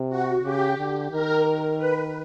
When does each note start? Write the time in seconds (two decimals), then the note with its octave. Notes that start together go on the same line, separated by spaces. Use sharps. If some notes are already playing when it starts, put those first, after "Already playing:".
Already playing: C3
0.09 F#4
0.42 C#3 G4
0.77 D3
1.11 D#3 A#4
1.77 B4